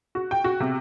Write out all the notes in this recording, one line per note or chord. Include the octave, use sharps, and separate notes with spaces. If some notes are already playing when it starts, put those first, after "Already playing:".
F#4
G5
F#4
C3